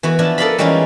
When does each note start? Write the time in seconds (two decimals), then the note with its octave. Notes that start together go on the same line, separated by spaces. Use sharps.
0.03 E3 B3 F#4
0.19 F3 D4 E4 A5
0.38 A4 A#4 D5 D#5 F5 B5
0.58 E3 G3 G#3 C#4 D#4 F4